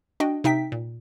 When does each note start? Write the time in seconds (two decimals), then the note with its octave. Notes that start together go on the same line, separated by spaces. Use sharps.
0.20 D4 F#4 D#5 G5
0.44 C3 D#4 E5 G5 B6
0.72 A#2